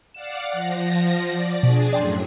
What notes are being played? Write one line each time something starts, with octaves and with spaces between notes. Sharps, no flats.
D5 F5 F#5 E7
F3 F#5 A#6
D5
B2 D4 G#4
F#2 A2 D5 G5 C6